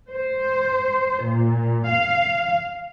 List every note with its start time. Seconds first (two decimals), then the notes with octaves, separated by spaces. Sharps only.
0.12 C5
1.23 A#2
1.87 F5